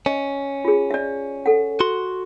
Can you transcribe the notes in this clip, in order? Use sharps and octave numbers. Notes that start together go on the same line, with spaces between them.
C#4 D#5
F4 G#4
D5 E5
A4 F#5
F#4 C6